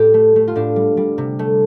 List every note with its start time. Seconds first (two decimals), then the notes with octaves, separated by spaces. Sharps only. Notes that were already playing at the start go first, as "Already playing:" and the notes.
Already playing: A2 G4 A4
0.14 A3
0.36 A3
0.48 F4
0.56 A2 D4
0.76 G3
0.97 G3
1.18 C3
1.39 A3